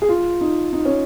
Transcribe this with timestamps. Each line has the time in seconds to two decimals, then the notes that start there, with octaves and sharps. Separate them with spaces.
0.02 G#4
0.09 F4
0.41 D#4
0.73 D#4
0.85 C#4